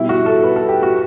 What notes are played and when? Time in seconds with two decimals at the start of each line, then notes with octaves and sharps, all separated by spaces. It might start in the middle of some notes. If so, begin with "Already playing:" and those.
Already playing: B2 G3 E4
0.09 F#4
0.26 A4
0.44 B4
0.56 A4
0.69 G4
0.83 F#4